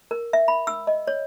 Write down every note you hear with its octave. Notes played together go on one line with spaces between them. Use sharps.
A#4
E5
B5
E6
D#5
C#5